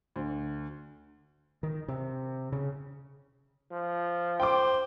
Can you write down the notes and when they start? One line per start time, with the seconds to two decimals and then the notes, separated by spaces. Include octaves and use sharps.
0.16 D2
1.63 D#3
1.88 C3
2.52 C#3
3.71 F3
4.40 C5 G5 D6